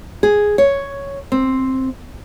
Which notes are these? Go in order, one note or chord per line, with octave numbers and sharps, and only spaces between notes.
G#4
C#5
C4